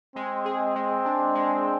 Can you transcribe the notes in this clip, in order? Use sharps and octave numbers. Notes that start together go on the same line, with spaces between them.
G#3 C4
G#4
G#3
D4
G#3